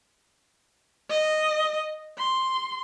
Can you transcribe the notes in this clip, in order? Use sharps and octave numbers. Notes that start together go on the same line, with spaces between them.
D#5
C6